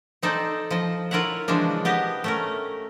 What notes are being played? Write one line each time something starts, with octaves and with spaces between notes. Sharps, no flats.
C4 D#4 A4 C5 D5
F3 D#5
E4 F4 A#4 C#5 E5 F#5
C#3 E3 F3 G#3 D4
B3 G4 D#5
A3 C#4 A#4